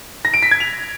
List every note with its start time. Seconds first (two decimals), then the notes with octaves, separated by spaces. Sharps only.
0.25 A#6
0.34 D7
0.43 B6
0.51 G#6
0.60 F7